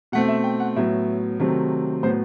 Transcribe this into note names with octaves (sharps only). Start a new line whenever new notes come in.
B2 A3 C4 F#5
E5
G5
F#5
A2 F#3 B3 E5
C3 D#3 F#3 A3 C4
A2 F#3 B3 C5